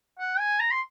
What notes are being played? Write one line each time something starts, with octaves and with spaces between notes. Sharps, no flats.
F#5
G#5
A#5
C6